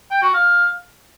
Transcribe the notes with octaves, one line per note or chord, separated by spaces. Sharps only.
G5
F#4
F5